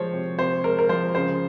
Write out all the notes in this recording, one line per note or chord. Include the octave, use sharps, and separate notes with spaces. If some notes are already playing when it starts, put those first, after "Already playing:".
Already playing: F3 G#3 C5 C#5
C3
C3 C5
G#3 A#4
A#4
F3 C5
C#3 C5